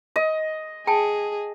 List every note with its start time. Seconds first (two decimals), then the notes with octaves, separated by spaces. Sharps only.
0.16 D#5
0.87 G#4 G5 A5